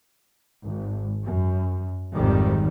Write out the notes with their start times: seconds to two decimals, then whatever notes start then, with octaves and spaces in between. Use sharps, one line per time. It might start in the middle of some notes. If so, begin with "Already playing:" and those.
0.65 G#1
1.24 F#2
2.14 G#1 F2 G#2 C3 D#3 G3